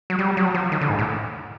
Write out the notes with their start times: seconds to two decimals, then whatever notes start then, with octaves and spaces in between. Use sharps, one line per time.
0.10 F#3
0.19 G3
0.37 F#3
0.54 F3
0.72 D#3
0.81 D3
0.89 G#2
0.99 A2